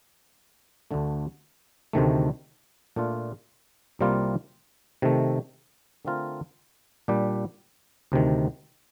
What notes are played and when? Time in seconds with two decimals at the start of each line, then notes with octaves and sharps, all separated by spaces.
0.91 D2 D3 A3
1.93 D2 C3 D#3 A3
2.96 A#2 A3 D4 F4
3.99 C2 C3 G3 A#3 F4
5.02 C3 D#3 A3
6.05 D3 A3 C4 F4 A#4
7.08 A#2 G3 D4 G4
8.12 D2 C3 D#3